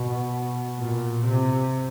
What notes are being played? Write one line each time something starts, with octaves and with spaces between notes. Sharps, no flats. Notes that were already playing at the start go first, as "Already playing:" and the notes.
Already playing: B2
A#2
C3